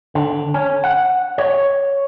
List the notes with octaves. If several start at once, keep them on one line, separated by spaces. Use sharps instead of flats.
D3
C#4
F#5
C#5